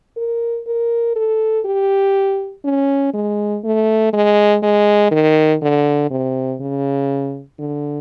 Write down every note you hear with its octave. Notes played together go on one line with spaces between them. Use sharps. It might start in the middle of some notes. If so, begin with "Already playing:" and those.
A#4
A#4
A4
G4
C#4
G#3
A3
G#3
G#3
D#3
D3
C3
C#3
D3